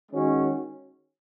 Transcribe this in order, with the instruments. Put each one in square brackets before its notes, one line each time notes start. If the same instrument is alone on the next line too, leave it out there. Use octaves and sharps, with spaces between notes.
[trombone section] D#3 G#3 C#4 F#4